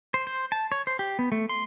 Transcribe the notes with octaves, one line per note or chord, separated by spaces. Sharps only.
C5
C5
A5
C#5
C5
G4
B3
A3
C6